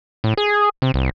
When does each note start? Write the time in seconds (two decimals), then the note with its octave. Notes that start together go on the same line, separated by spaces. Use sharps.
0.24 A2
0.37 G#4
0.82 C3
0.94 C2